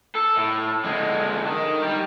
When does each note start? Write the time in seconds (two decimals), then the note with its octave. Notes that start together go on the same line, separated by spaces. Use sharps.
0.15 A4
0.37 A2
0.85 D3 G#3
1.47 D#3
1.83 G3 G4